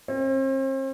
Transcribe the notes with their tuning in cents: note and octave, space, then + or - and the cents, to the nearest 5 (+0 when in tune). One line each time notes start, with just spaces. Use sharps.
C4 +40